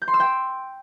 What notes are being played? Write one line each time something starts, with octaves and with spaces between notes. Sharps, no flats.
G6
C6
E6
G5